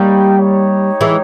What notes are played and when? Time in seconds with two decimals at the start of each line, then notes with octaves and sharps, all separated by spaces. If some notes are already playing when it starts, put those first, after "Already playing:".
Already playing: G3 A#3 D#4 G4 C#5 G5
0.39 D#4 G4 C#5
1.01 E3 G#3